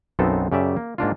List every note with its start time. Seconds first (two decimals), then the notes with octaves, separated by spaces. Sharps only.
0.19 B1 F#2 B3 C4 D#4 A4
0.52 F#2 C#3 G4 D5 E5
0.77 A#3
0.98 G#2 A#3 D4 F4